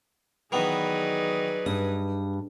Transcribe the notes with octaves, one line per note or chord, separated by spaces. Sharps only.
D#3 E3 F#3 B3 D#4 G#4 B4 D5
G2 D#6